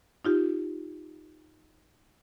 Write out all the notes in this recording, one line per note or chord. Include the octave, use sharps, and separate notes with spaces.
D#4 F4 G4